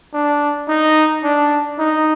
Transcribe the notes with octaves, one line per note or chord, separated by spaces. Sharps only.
D4
D#4
D4
D#4